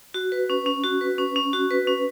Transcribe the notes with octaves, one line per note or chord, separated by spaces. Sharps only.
F#4
B4
C#4
C#4
F#4
B4
C#4
C#4
F#4
B4
C#4